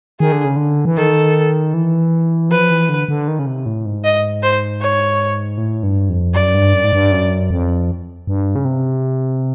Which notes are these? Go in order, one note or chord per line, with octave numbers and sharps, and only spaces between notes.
D#3 G#4
D3
C#3
D3
E3
D#3 A4
E3
F3 B4
E3
D3
D3
D#3
C#3
C3
A2
G#2
D#5
C5
C#5
A2
G2
F2
F#2 D5
G2
F#2
G#2
G2
F#2
F2
G2
C#3
C3